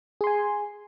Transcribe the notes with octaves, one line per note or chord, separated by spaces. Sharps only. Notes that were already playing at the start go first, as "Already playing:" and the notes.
G#4 G#5 C6